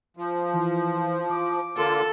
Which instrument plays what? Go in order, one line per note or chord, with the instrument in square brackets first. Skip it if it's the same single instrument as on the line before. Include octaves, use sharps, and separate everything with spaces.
[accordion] F3
[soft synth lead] E3
D6
[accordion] D3 A#3 F4 [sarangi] A4